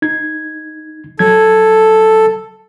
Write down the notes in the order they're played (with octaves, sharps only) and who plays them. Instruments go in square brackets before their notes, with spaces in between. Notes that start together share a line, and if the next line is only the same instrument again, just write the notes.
[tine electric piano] D#4 G#6
[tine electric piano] F#3 G#6 [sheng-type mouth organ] A4